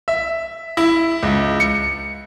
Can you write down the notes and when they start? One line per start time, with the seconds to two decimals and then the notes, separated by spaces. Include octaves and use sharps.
0.08 E5
0.77 E4
1.23 C#2
1.60 C#7